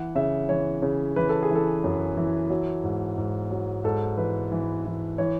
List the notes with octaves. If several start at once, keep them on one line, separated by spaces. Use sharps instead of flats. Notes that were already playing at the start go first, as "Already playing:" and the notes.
Already playing: E3 F#5
C#3 E5
E3 C#5
C#3
E3 B4
A4
G#4
E3 A4
F#2
E3
F#3
G#2
G#2
F#3
G#2 A4
E3 B4
E3
E3
E3 C#5